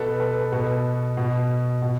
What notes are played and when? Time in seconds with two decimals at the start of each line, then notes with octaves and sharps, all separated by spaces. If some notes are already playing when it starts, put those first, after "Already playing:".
Already playing: B2 A4 B4
0.20 A4 B4
0.52 B2 A4 B4
1.17 B2
1.82 B2